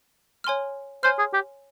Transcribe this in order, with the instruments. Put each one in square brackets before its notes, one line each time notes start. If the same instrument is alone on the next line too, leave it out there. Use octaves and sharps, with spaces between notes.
[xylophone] C#5 G#5 C6 F6
[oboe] C5 [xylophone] C#5 G#5 C6 F6
[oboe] G#4
G4